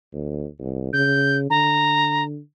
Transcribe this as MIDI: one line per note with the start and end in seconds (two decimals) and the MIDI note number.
0.13 0.47 38
0.60 0.91 36
0.93 1.47 49
0.93 1.38 91
1.50 2.39 50
1.50 2.24 82